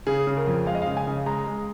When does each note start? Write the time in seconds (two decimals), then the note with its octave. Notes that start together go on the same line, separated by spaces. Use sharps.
0.07 C#3 G#4
0.27 C#3
0.37 A#4
0.47 F2
0.67 G#3 F5
0.75 D#5
0.82 F5
0.87 C#3
0.97 G#5
1.07 C#3
1.26 G#3 A#5
1.47 G#3